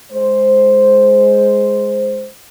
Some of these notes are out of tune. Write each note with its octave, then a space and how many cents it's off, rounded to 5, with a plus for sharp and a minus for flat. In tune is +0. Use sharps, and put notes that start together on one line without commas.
G#3 +0 C5 +0